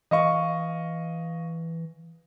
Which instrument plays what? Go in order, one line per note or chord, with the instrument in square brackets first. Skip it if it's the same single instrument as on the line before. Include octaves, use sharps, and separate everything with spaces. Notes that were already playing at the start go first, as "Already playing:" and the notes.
[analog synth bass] E3 [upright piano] D#5 F5 C#6